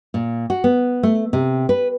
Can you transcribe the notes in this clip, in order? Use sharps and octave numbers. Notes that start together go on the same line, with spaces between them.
A#2
F#4
B3
A3
C3
B4